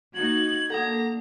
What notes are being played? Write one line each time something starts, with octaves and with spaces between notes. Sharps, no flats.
A#3 D#4 F#4 G#6 F#7
A#3 D4 A4 F#5 A#5